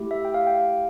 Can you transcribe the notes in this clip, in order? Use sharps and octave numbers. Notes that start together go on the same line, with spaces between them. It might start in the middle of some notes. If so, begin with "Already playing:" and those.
Already playing: A3 E4 G4
E5
G5
F5
G5
F5